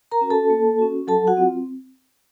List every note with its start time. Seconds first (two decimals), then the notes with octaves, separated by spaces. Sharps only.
0.11 A#4 A#5
0.21 C#4 F#4
0.30 A4 A5
0.50 A#3
0.79 C#4 F#4
1.07 F#3 A4 A5
1.27 F#4 F#5
1.37 C4 F4